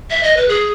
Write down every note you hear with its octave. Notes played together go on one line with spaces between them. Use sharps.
E5
D#5
B4
G#4